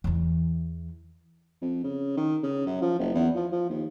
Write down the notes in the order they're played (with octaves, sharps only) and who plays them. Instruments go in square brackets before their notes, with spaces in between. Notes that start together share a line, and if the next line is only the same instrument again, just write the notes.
[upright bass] E2 E3
[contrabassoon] F2
C#3
D#3
C#3
F#2
F3
F#1
E2
F3
F3
D#2